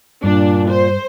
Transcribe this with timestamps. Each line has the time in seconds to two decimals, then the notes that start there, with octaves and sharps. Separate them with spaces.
0.24 G2 A#2 D4
0.69 C5